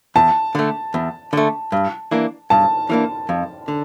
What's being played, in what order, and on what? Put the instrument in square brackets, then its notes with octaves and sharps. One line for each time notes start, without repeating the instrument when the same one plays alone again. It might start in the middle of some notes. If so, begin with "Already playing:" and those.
[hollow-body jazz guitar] E2 [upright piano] A5
[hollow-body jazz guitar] D3 A3
E2
D3 A3
G2
E3 A#3 D4
[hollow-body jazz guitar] G2 [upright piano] A5
[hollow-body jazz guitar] E3 A#3 D4
F2
D3